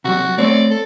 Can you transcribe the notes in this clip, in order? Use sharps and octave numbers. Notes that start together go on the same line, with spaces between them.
C3 F#3 F#4
A3 C4 C#5 D5
A4